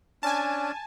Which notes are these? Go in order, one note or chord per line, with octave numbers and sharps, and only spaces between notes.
C#4 D4 G#5 A5